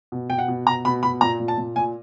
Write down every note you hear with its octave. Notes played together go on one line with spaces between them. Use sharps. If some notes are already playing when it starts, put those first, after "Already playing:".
B2
B2 G5
F#5
B2
B2 A#5
B2 B5
B2 B5
A#2 A#5
A#2
A5
A#2
A#2 G#5